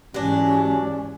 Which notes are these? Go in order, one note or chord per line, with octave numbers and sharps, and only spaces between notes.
G#2 E3 F#3 C#4 D4 G4